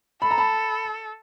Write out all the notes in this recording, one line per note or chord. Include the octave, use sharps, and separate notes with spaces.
A4 B5
A#5
A5 B5